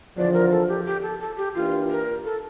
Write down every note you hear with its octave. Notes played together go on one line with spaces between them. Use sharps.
E2 D3 F3 D5
A#4
A4
G4
G4
A4
A4
G4
E3 A#3 D4 F4 G4
A#4
A4